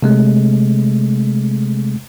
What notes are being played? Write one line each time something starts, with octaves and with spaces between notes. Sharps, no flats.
C3 G#3 A3